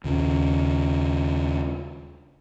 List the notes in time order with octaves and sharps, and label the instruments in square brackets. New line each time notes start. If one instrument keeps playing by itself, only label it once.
[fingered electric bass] D#2 C#3